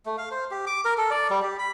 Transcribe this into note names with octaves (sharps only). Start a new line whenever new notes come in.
A3
F5
C5
G4
D6
A#4
A4
D5
G3
G4
B5